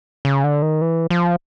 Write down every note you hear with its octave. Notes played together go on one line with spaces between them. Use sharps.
C#3
D3
D#3
E3
F3